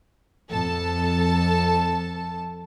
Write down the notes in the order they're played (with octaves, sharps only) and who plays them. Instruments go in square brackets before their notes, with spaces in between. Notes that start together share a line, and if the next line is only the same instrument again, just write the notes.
[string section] F2 A4 A5